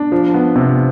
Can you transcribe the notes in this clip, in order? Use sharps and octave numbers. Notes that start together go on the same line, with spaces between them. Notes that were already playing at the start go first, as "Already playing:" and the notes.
Already playing: D4
F3
B3
C3